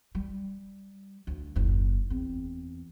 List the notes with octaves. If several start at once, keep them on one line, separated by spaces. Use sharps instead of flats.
G3
D2
F#1 D#2
E2 C4